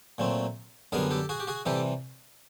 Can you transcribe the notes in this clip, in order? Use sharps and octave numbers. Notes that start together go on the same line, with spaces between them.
A#2 F#3 A3 C4
F#2 D3 G3 B3 G#4 A#4
G4 A4
F#4 G#4
G4
F#4 G#4
C3 E3 G3 G4 A4